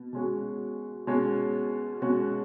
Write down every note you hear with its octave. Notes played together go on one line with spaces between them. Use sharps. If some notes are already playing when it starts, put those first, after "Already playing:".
Already playing: B2
B2 G#3 C#4 F#4
B2 G#3 C#4 F#4
B2 G#3 C#4 F#4